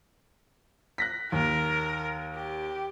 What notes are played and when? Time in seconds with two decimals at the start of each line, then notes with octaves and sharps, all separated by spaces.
0.98 F#6 A#6 B6
1.32 D#2 A#4
2.37 G4